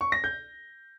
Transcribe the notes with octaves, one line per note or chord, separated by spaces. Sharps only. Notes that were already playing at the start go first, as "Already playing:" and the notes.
C#6
A#6
G6